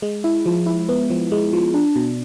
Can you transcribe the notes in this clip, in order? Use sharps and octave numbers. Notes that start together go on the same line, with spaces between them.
G#3
E4
F3
E4
B3
F3
G#3
F3
D4
B2